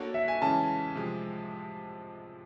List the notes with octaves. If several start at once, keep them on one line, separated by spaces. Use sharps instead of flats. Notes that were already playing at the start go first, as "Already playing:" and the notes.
Already playing: A#3 D4 F#4 A4 C#5
E5
G#5
C#3 E3 G#3 C#4 A5
C3 F3 G#3